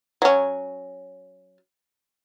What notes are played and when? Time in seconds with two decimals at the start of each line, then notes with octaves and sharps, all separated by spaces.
0.22 F#3 C#4